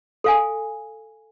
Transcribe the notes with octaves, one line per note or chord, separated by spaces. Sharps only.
A4 F5 G#5